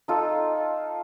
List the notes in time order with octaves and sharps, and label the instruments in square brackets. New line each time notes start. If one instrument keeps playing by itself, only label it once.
[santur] D#4 F4 A4